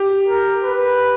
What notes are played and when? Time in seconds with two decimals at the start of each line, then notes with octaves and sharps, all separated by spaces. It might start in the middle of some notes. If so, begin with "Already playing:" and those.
Already playing: G4
0.28 A#4
0.63 B4